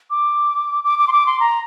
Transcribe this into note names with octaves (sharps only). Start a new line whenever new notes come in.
D6
D6
D6
C6
D6
C6
A#5